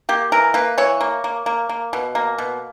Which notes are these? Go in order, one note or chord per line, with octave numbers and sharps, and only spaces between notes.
A#3 G4
E3 A#4
A#3 B4
E3 C#5
A#3
A#3
A#3
A#3
B2
A#3
B2